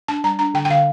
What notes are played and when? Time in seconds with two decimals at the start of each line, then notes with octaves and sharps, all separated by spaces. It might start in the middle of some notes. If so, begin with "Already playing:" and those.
0.08 D4 A5
0.24 G3 A#5
0.39 D4 A#5
0.54 D3 G5
0.65 G5
0.70 D3 F5